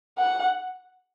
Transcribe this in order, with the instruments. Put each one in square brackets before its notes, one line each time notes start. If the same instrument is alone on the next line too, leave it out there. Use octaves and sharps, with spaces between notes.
[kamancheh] F#5